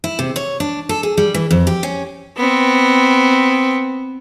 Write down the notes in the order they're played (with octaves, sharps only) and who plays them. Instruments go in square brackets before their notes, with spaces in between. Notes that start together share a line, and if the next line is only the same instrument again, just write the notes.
[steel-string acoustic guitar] E4
C3
C#5
D4
A4
G#4
G3
E3
F2
G4
C#4
[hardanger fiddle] B3 C4